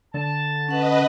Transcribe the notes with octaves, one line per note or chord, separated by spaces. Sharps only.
D3 A5
C#4 B4 D#5 F#5